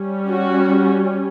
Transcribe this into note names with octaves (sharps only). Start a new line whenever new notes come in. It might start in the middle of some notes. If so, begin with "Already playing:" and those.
Already playing: G3 C#4
F#4